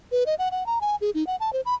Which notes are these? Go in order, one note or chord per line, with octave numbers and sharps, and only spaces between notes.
B4
D#5
F#5
F#5
A#5
G#5
G#4
D#4
F#5
A5
C5
B5